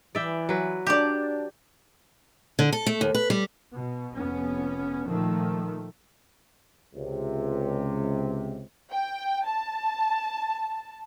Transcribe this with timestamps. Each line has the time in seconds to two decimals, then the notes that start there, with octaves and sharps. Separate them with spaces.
0.15 E3 D5 E5 G5
0.49 F#3 B4
0.87 D4 G4 D5
2.59 D3
2.73 A4
2.86 A3
3.01 D#2
3.15 B4
3.30 G3
3.73 B2
4.15 F1 B3 C#4
5.07 A#2 D#3 F3 A3
6.95 C#2 C3
8.91 G5
9.46 A5